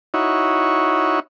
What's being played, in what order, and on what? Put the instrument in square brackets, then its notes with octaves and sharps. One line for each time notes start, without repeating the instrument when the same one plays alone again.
[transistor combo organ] D#4 E4 F#4 C#5